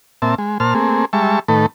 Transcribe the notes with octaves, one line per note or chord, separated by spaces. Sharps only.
A#2 C4 E5 A5
G#3
A#2 C5 A5 F6
A3 A#3 C4 G#4
G3 G#3 E5 A5 C#6
A2 D#3 A3 A4 B4